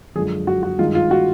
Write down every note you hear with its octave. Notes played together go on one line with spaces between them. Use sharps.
F#2 D3 F3 G#3 G#4
F#4
F#4
G2 D#3 G#3 F4
F4
F#4